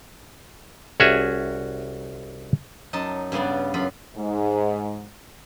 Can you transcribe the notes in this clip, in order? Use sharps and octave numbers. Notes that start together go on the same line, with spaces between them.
C2 C#4 F#4 G#4 E5
F#2 D#4 D#5 A5
G2 C#3 G3 B3 D5
F#2 F4 B5
G#2